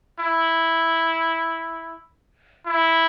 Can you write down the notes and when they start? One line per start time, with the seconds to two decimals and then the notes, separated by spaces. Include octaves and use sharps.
0.20 E4
2.66 E4